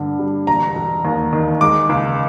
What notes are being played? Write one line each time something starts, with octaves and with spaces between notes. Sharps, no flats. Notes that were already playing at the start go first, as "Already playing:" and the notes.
Already playing: G2 D3
G3
E1 A#5
E1
D#2
D#3
G#3 D6
C#2